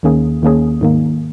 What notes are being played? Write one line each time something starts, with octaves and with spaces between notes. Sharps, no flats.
D#2 D#3 A#3 C#4 G#4
D#2 D#3 A#3 C#4 G#4
G#2 D#3 A#3